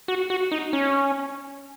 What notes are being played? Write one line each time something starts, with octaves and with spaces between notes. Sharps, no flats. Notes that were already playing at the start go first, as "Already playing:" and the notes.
F#4
F#4
D#4
C#4